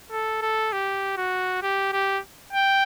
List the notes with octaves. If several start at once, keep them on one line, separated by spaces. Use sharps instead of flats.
A4
A4
G4
F#4
G4
G4
G5